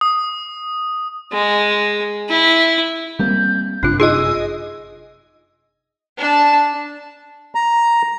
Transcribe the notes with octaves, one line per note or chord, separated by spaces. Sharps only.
D#6
G#3
E4
G3 A#3 C4 G6
G1 F#2 C3 D4 F4 F#6
D#4 F4 G#4 D#5 E6
D4 A5
A#5